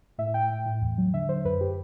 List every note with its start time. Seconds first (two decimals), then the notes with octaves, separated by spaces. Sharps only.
0.18 A2 E5
0.34 A2 G5
0.50 A2
0.66 A2
0.82 E2
0.98 F#3
1.13 D3 E5
1.29 D3 C5
1.45 F#2 B4
1.61 G4